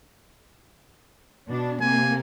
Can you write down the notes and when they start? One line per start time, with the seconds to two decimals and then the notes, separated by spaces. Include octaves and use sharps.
1.48 B2 D4
1.81 C3 A#3 G#5